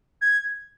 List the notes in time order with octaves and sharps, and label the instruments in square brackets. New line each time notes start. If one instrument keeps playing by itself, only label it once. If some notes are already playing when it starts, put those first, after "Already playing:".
[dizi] G#6